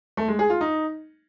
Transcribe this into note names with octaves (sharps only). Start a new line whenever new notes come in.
A3
G#3
G#4
F4
D#4